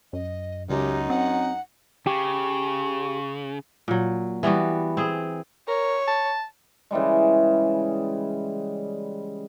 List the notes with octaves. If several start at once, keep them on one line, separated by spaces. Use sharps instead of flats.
F#2 D#5
C#2 F#2 D#4 G4
C4 F#5
C#3 G4 C#6
A#2 F#3
E3 G3 B3 F#4
C4 G#4
A#4 C#5
A5
C#3 E3 G3 G#3